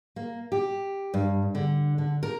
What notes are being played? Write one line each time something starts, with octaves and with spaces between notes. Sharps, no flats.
A#3
G4
G2
D3
D3
A#4